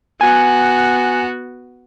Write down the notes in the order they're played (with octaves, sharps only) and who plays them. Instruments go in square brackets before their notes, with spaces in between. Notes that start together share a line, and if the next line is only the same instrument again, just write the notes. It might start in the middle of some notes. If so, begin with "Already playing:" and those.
[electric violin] B3 F#4 [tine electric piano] G#5